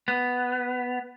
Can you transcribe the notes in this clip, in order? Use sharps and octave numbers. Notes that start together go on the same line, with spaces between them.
B3